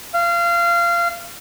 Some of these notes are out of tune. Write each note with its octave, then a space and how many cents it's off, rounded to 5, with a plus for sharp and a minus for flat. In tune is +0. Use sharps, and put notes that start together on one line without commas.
F5 -25